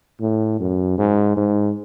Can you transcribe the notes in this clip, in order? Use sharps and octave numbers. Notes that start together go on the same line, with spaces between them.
A2
F#2
G#2
G#2